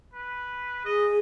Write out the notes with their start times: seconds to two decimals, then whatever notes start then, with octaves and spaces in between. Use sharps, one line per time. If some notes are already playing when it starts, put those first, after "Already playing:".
0.14 B4
0.85 G#4 D#5